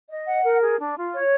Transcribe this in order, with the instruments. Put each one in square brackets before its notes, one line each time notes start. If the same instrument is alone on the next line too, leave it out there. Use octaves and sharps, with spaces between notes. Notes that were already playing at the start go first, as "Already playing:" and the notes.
[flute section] D#5
F#5
A#4
G#4
D4
F4
C#5